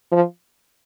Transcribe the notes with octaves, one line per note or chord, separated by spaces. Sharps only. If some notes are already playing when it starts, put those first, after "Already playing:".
F3